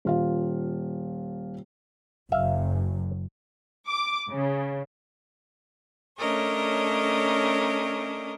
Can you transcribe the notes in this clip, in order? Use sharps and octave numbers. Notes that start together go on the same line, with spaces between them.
D#1 F4 F5
F#1 F#2 E5 F5
D6
C#3
A3 C#4 D4 A#4 C#5 D#5